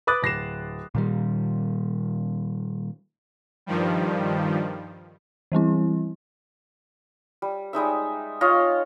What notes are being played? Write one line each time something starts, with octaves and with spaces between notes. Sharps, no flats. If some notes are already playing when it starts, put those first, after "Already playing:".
B4 B5 D6 D#6 F#6 A6
D1 A#6 C7 E7
A#2 D#3 G3
G2 D#3 F3 G3
E3 G3 C4 E4
G3
G3 G#3 D#4 E5
F4 C#5 D#5 F5